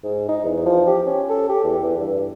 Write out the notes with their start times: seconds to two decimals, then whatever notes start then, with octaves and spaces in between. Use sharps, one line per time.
0.03 G#2
0.29 D#4
0.44 E2
0.66 F3
0.87 G4
1.06 C#4
1.29 A4
1.49 G4
1.64 E2
1.83 E2
1.99 G2